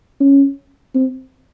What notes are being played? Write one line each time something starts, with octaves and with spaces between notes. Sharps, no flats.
C#4
C4